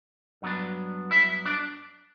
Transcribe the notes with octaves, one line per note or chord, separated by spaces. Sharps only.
G2 F#3 B3 D4
E4 E5
D4 D5